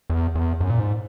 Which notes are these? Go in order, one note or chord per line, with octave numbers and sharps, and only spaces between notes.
E2
E2
F#2
A#2
G#2